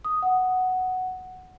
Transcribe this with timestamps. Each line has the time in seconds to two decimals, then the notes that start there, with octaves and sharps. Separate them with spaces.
0.05 D#6
0.22 F#5